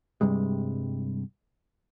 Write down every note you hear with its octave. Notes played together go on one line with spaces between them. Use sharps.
G2 C3 G3 G#3